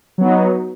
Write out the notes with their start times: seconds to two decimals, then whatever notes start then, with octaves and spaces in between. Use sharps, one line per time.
0.18 F#3
0.21 B3
0.24 D#4